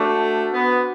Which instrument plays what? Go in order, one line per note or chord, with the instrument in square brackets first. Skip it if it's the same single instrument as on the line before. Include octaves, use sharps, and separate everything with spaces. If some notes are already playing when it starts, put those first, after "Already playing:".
Already playing: [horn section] A3 [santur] D4 F#4 C5
[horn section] B3